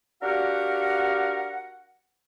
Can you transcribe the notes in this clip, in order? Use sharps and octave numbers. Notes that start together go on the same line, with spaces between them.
D4 F#4 G4 A#4 F5 F#5